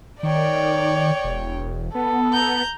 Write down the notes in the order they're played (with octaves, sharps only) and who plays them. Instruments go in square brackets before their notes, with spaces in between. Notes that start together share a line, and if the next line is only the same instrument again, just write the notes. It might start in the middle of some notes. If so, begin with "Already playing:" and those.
[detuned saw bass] D#3 [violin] C#5 G5 [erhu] D5
[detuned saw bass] E1
[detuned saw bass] B3 [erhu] A4
[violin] A#5 G6